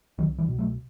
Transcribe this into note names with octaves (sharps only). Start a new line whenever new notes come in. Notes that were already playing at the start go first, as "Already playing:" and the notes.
C2 D#3 F#3
E3 G3
B2
F#3 A3